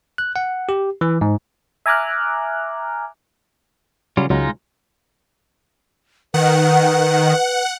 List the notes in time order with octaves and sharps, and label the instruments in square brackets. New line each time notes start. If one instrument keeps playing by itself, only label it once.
[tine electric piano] F#6
F#5
G4
E3
G#2
[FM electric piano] E5 G#5 A#5 D6 F6 F#6
[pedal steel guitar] C#3 G3 F4 [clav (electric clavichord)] F#3
[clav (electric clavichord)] C#2 F#3 [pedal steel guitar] G#3 D#4 F4
[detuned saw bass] D#3 [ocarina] B4 [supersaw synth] F#5